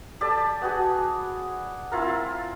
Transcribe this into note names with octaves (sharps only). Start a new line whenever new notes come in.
G4 A4 D5 A5
B3 F#4 G#4
C4 E4 F4 A#4